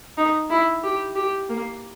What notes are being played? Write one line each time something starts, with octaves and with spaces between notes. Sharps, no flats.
D#4
E4
G4
G4
A#3